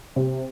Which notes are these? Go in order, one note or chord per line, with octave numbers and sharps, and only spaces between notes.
C3